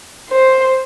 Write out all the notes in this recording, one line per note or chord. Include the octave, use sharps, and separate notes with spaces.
C5